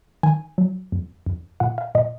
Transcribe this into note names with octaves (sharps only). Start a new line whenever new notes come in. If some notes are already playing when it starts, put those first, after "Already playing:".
D#3 G#5
F#3
F2
F2
A#2 F#5
F5
A#2 D#5